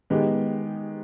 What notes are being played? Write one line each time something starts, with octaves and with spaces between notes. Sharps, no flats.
D#3 G#3 B3 D#4 G4